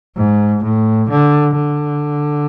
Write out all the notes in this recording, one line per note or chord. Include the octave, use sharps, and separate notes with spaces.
G#2
A2
D3
D3